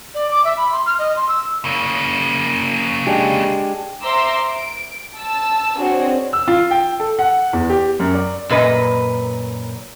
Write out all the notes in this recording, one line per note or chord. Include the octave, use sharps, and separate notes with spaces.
D5
D6
E5
B5
C6
F6
D#5
C6
E6
C#3 A#3
G#3 D4 G4
C5 E5 A#5 C6 D6 E6
D7
A5 E6
C4 D4 F#4 G#4 C5 C#5
E6
F4
G5
A4
F#5
E2
G4
F#2
D5
F#2 A#2 B4 D#5